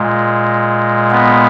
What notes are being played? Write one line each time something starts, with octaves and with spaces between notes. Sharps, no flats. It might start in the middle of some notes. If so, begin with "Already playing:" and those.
Already playing: A#2 G#3
B3